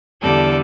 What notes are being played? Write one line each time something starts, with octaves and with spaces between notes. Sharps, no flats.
E2 D3 G3 A4 D5